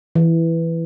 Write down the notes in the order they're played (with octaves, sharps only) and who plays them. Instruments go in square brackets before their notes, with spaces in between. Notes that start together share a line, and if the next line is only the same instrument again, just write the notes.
[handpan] E3